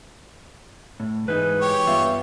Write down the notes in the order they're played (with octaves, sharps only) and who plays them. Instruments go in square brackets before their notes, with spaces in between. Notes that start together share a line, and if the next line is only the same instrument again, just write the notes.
[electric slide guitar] A2
[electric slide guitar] G#2 E3 D#4 [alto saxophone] B4
[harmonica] G4 C#5
[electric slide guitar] G2 B3 F4 [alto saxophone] E5